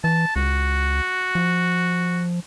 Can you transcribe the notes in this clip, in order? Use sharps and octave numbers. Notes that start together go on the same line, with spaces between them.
E3 A5
C#2 F#4
F3